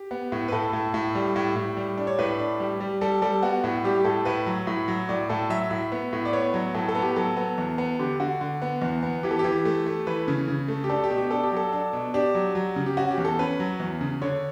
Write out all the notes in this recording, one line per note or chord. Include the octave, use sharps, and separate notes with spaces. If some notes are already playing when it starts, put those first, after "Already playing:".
Already playing: G4
B3
A2
B4
A2 A4
A2
A2
G3
A2
A2
G3
D4
C#5
A2 B4
D4
G3
G3
G3 A4
G3 A4
B3 F#4
A2
G3 G4
G4
A2 A4
A2 B4
F#3
A2
F#3
A2 D5
A2 A4
F#3 E5
A2
B3
A2
D5
B3 C#5
F#3
A2 A4
A4
B3
G4
F#3 A4
B3
E2
B3
D3 G4
D3 F#4
D3
B3
E2
B3
E3 G4
A4
E3 G4
A3
A3
E3 B4
C#3
C#3
A3
G4
D4 A4
G4
B2
G4
D4 A4
G4
F#3 A4
D4
B2
D4 G4
F#3
F#3
C#3
G4
C#4 F#4
G4
E2
A4
C#4 B4
F#3
E2
C#3
D3 C#5